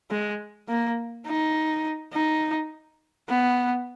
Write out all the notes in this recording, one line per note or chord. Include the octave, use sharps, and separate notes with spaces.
G#3
A#3
D#4
D#4
B3